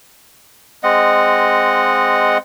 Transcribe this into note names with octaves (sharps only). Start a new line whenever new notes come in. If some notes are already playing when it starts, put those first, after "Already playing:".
G#3 C4 D#5 F#5